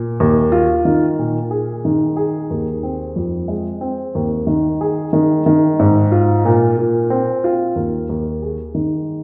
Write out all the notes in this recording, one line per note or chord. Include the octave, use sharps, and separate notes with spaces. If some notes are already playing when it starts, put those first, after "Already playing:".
Already playing: A#2
D#2
F4
D#3
A#2
G#4
D#3
G#4
D#2
C4
F2
G#3
C4
D#2
D#3
G#4
D#3
D#3
G#2
F4
A#2
A#2
C4
F4
D#2
D#2
G#4
D#3